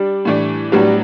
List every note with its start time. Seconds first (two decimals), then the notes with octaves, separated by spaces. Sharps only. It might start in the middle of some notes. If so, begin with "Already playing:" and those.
Already playing: G3 D4
0.25 A2 E3 A3 D4
0.72 A2 F#3 G3 B3 D4